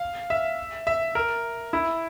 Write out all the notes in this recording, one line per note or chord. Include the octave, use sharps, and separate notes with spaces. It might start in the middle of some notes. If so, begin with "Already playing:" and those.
Already playing: F5
E5
E5
A#4
E4